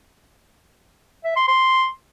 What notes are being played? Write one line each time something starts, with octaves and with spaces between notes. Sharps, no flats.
E5
C6
C6